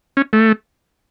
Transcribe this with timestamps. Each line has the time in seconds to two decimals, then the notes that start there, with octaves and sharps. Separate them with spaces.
0.17 C#4
0.33 A3